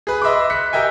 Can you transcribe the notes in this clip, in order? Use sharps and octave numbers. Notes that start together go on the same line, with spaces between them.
G#4 B4
D#5 E5 B5 C6 D6
F#6 B6 C#7
G4 A#4 D#5 E5 G5 G#5